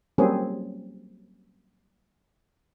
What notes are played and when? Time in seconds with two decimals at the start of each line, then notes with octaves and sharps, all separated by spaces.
0.18 F#3 G3 A#3 C4 C#4 G#4